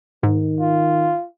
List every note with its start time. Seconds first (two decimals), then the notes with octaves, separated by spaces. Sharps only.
0.23 G#2 D#3
0.60 F4